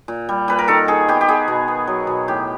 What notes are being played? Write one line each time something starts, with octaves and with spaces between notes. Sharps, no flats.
A#2
G3
A#2 B4
A#4
D#3 A4
D#3 G#4
B3 G4
G4
B3 G#4
B2
B3
F#3
B2
A2 G4